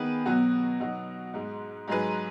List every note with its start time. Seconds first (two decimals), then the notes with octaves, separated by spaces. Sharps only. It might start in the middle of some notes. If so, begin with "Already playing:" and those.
Already playing: D#3 B3 G#4 B4
0.26 B2 F#3 B3 F#4
0.80 B2 F#3 B3 D#4 F#4
1.34 G#2 G#3 D#4
1.88 G#2 F#3 D#4 G#4 B4